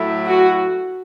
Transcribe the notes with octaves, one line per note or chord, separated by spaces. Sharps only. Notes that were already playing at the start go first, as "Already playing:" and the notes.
Already playing: A2 F#3 A3 E4
F#4